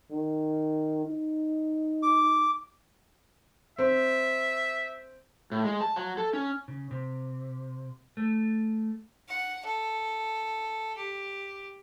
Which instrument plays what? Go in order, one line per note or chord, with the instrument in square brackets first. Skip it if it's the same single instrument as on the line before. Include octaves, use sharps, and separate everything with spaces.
[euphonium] D#3
D#4
[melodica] D6
[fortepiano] C4 [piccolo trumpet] E5
[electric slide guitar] A2
G#3
A5
F#3
A4
C#4
C#3
C3
A3
[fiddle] F#5
A4
G4